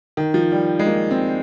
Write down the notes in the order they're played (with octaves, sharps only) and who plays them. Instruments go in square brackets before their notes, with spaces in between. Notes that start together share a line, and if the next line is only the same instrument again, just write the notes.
[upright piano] D#3
F3
G3
G#3
A#3
C4